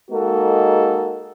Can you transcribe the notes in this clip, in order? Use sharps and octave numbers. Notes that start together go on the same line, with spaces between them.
G#3 A#3 D#4 F#4 G#4 A4